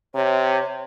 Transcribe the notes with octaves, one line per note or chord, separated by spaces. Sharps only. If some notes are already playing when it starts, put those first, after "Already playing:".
C3 C#5